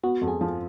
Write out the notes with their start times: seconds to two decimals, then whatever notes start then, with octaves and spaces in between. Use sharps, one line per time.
0.03 B3 F#4
0.21 F2
0.28 G#4
0.41 F3